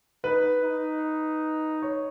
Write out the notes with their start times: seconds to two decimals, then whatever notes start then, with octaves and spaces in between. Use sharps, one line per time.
0.24 D#4 B4
0.63 D#4
1.82 C#5